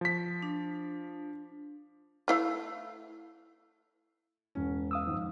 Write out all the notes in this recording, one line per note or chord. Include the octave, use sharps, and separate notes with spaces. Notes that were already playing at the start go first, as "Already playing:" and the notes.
F3 B6
D4
A3 E4 F5
E1 C#4
F5 D#6 E6
G#1 F2